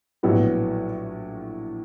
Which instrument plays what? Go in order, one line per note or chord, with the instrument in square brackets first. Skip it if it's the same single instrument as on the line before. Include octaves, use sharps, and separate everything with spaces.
[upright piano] A#1 A2 F#3 B3